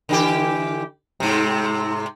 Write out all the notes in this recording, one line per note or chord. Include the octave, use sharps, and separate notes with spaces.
D3 E3 G4
G#2 C3